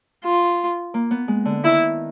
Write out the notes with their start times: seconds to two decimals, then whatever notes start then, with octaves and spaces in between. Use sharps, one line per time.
0.24 F4
0.94 A#3
1.11 B3
1.28 G#3
1.45 D3
1.64 D#3 E4